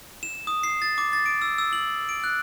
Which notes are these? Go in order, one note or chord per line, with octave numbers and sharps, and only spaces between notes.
E7
D#6
C7
A6
D6
A6
D7
E6
E6
F#7
D7
F#6